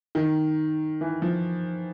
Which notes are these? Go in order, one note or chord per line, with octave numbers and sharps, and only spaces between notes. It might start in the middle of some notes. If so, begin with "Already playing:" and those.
D#3
E3
F3